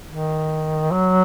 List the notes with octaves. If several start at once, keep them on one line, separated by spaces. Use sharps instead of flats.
D#3
F#3